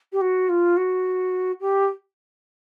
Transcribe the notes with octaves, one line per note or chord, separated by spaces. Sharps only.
G4
F#4
F4
F#4
G4